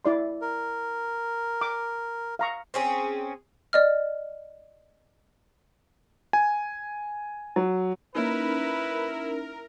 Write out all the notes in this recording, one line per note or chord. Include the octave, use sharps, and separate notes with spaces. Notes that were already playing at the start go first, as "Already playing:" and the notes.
E4 D5 C6
A#4
D6
F5 A#5 C#6
C4 C#4 G#4
D5 D#5 F6
G#5
F#3
A#3 C#4 D#4 E4 A#4 B4